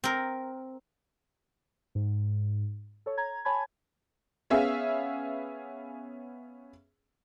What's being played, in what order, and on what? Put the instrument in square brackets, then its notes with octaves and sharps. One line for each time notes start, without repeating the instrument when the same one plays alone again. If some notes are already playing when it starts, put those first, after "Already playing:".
[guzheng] C4 A#4
[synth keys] G#2
A4 C#5
A#5 G#6
C#5 G#5 A5 B5 G#6
[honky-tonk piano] B3 C#4 G#4 E5 F5